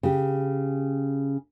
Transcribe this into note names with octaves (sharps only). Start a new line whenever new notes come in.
C#3 G4